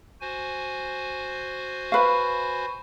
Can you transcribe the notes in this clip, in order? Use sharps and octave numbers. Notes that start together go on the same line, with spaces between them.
F#4 C5 G#5
B4 F5 B5 C#6